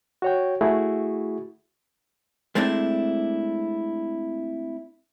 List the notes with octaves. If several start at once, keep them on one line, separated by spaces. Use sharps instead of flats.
F#4 C#5 G5
A3 E4 F#4 G#4
G#3 A3 C4 D4 E4